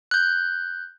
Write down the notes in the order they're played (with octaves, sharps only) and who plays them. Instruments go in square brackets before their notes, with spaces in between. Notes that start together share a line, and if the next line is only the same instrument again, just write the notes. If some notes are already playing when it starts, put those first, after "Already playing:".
[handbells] F#6 G6